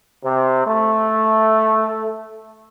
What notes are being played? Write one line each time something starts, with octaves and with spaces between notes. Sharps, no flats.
C3
A3